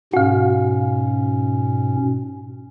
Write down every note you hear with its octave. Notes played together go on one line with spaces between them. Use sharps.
G#2 B2 C#4 F#4 F5